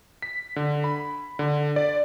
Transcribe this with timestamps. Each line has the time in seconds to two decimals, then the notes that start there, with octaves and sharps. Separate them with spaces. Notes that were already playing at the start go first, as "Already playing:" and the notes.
0.22 B6
0.56 D3
0.84 B5
1.39 D3
1.76 D5